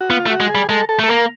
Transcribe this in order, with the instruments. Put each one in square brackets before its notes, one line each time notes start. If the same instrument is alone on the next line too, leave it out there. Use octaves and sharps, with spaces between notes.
[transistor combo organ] F#4
[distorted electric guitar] B3 [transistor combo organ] F4
[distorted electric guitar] A3
[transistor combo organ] F#4
[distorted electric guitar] G#3
[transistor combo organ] G#4
[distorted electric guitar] G3
[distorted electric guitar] G#3 [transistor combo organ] A4
[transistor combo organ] A4
[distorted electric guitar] A3 [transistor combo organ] A4
[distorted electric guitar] A#3 [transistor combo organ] A#4